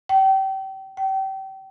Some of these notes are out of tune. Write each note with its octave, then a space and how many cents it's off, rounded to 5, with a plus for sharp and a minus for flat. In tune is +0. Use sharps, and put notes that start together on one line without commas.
G5 -30
G5 -30